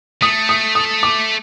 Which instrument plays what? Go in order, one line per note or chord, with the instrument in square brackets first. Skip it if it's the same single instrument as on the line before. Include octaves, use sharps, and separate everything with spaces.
[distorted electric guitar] A3 [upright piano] D#6
[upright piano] D#6
D#6
D6